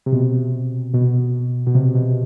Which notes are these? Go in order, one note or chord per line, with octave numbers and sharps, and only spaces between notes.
C3
B2
B2
B2
C3
B2